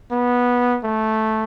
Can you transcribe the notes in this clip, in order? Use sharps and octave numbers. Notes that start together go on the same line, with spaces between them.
B3
A3